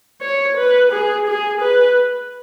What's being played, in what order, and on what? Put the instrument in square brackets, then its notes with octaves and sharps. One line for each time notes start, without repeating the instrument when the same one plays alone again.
[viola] C#5
B4
G#4
G#4
B4